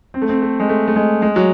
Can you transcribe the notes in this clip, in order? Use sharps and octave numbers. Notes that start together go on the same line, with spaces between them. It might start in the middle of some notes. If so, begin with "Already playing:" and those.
C4
A3
C4
A3
G#3
A3
A3
G#3
G#3
F#3